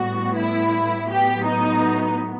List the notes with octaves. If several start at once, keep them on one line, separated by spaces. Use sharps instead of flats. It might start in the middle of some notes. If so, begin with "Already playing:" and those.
Already playing: A2 G3 B3 F#4
E4
A2 F#3 B3 G4
D#4